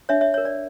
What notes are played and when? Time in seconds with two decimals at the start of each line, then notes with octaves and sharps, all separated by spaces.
0.09 D4 C#5 E5
0.21 C#5 E5
0.34 A#4 C#5
0.45 D5